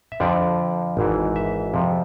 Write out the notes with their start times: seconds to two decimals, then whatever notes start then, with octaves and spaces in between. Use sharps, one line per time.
0.12 E5
0.20 F2 D3 F3 D5
0.97 G#1 G#2 E3
1.36 E5
1.74 F2 C3 F3